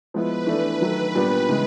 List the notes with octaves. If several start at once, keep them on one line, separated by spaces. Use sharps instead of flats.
F3 G#3 B3 E4 B4
E3 A3 D4 B4
D#3 F#3 A3
A#2 G3 B3 D4
C#3 E3 G#3